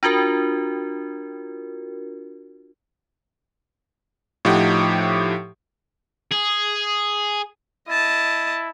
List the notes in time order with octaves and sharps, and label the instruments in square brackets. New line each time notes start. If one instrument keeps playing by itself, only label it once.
[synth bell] D4 F4 F#4 A#4
[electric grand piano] A2 F3 D#4 G4 F#5
[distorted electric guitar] G#4
[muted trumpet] E4 [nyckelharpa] D#5 A5